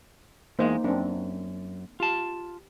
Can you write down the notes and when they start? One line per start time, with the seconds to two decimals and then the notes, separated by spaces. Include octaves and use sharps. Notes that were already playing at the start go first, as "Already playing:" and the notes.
0.59 E2 G#3 A#3 D#4 C5
0.84 F#2 C4 D4
2.00 F4 G4 A5